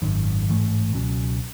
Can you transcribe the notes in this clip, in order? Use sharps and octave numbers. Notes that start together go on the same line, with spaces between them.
G#1 F#2 D#3
A1 G#2 E3 A3
C#2 B2 F#3 C#4